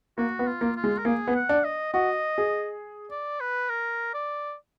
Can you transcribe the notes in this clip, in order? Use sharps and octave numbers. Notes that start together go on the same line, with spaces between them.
A#3 F#4
B3
F4
A#3
F4
G#3
A#4
A#3 G#4
B3
F#5
D4
D#5
F#4 D#5
G#4
D5
B4
A#4
D5